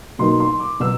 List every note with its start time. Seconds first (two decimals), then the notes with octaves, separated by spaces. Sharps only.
0.19 B2 F#3 A#3 D#4 C6
0.40 C6
0.60 D6
0.80 B2 F#3 E6